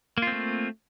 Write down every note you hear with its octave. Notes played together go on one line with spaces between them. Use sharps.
A3 A#3 C4 F4